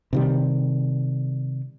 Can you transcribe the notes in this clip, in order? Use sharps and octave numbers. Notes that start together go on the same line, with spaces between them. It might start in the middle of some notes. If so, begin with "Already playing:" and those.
C3 D#3 G3